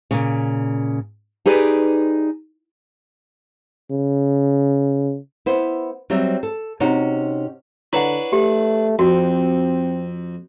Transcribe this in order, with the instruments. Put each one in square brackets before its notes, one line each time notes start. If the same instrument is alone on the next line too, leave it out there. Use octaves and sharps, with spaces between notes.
[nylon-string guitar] A#2 C#3
D#4 G4 G#4 B4 D5
[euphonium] C#3
[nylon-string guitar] B3 E4 C5
F#3 G3 C4 E5
A4
C3 C#4 D#4 F#4
[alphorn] D3 [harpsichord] D4 B4 C#5 [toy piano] E4 F#5
[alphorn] A3 [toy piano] G4
[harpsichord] F2 [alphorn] C4 [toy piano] F#4